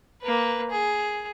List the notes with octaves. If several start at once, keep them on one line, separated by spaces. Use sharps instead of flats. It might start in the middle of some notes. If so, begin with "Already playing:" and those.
A#3 B4
G#4